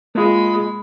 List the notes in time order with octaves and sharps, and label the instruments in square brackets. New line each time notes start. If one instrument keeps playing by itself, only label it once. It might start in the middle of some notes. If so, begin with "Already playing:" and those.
[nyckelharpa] G#3 B5 [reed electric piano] A#3 F4